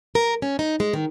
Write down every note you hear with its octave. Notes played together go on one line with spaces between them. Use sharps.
A#4
C#4
D#4
G#3
D#3